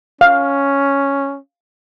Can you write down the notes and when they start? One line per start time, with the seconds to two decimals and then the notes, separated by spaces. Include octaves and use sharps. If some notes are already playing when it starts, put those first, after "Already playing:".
0.21 C#4 F5